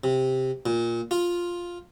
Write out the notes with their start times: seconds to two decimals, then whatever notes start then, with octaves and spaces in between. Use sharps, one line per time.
0.04 C3
0.66 A#2
1.11 F4